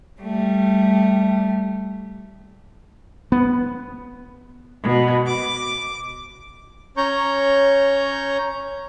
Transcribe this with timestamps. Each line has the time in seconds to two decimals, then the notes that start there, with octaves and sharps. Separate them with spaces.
0.21 G3 A3
3.32 B3
4.83 B2
5.25 D6
6.97 C#4 C#5 A#5 C#6 G6